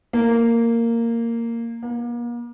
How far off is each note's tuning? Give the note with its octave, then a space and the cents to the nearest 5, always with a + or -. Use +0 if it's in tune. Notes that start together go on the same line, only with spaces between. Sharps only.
A#3 -10
A#3 +40